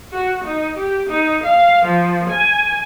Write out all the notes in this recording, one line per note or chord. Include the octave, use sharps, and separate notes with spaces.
F#4
D#4
G4
D#4
F5
F3
G#5